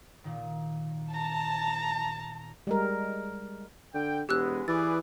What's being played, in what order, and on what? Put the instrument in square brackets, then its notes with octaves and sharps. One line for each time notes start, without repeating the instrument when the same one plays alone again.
[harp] A#2 D#3
[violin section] A5 [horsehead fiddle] A#5
[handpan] G3 G#3 A#4
[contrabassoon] D3 [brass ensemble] G5
[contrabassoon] E1 [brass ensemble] G#3 B3 [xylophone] G4 E6 F#6
[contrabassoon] E3 [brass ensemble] G#4 B4 D5 [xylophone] A6